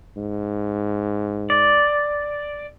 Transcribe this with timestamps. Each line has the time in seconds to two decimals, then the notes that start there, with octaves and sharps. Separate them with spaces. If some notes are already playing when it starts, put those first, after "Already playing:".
0.17 G#2
1.50 D5